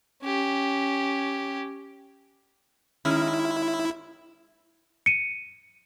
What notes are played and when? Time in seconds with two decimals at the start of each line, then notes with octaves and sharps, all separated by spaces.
0.22 C#4 G4
3.05 D#3 G#3 C#4 E4
5.06 C#7 D#7